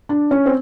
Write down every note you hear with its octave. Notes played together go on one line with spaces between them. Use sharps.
D4
C#4
C4